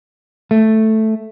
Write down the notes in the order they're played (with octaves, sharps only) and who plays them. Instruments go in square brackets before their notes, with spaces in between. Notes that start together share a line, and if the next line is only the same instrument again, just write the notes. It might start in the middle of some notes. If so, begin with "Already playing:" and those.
[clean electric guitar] A3